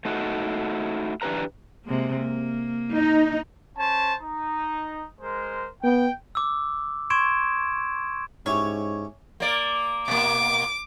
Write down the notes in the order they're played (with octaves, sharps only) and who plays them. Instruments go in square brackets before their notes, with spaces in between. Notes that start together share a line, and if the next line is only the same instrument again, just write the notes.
[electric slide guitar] A3 D#4 E4 F#4
E3 D4 G4 B4 A#5
[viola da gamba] C3 G#3 A#3
A#3
[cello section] D#4
[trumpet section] C#4 C5 A5
D#4
G#3 A#4 C5
[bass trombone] B3 [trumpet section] G5
[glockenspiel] D6 E6
C6 C#6 G#6 D7 E7
[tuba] G#2 [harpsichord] C#4 E4 G4 [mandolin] C#5
[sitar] A#3 D5
[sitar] B2 A#3 [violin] D6